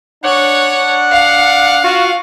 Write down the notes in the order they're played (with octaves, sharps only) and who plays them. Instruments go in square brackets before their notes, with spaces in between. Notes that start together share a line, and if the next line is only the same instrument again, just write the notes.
[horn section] D4 F#5 [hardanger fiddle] C#5
[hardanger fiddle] F5
[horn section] F4 F#4